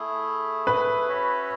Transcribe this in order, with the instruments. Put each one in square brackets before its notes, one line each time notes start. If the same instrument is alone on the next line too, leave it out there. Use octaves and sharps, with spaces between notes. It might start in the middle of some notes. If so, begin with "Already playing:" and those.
Already playing: [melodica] A3 E4 G#4
[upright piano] B4
[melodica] C#4 F#4 C#5 E5